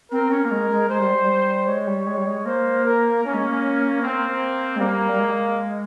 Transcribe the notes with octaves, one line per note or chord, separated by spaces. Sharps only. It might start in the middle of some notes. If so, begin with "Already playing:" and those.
C4 A#4
C#4
A#3
G#3
G#3
G#3 C5
G3
G3
G#3 C#5
G3
G#3
G3
G#3
A#3 C5
A#4
A#3 C#4
G#3
A#3
C4
G#3
G3 A#3
G3
G#3